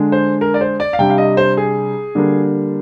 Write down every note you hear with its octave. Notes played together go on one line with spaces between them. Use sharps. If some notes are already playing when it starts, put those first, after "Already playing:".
Already playing: D3 G#3 D4
C5
A#4
D5
C5
D5
F5
C3 G3 D4 G5
F5
D#5
C5
G#4
D3 G3 A#3 D4